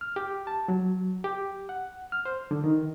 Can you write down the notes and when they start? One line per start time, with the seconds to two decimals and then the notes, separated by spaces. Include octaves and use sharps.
0.01 F6
0.16 G4
0.47 A5
0.68 F#3
1.24 G4
1.69 F#5
2.12 F6
2.25 C5
2.51 D3
2.64 D#3